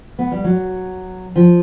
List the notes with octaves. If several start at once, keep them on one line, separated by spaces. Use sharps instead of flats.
B3
G3
F#3
F3